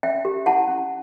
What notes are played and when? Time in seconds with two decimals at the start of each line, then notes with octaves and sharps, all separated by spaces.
0.03 C#4 E5 G5
0.25 G4
0.46 E4 F#5 A5
0.68 C#4